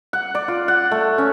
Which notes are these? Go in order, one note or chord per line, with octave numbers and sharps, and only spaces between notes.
F#5
D5
F4
F#5
A3
C#4